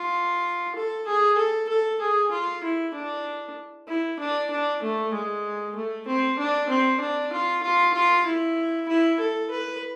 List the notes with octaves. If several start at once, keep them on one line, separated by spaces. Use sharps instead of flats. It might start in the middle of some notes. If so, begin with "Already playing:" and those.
Already playing: F4
A4
G#4
A4
A4
G#4
F4
E4
D4
E4
D4
D4
A3
G#3
A3
C4
D4
C4
D4
F4
F4
F4
E4
E4
A4
B4